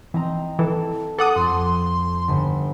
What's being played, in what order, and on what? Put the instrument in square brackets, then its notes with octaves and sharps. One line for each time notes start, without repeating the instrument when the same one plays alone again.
[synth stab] E3 [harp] C4 D#5 A#5
[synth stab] E3 [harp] A4
[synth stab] A4 F#5 D#6 [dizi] D6
[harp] F2 C7 [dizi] C6
[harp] G1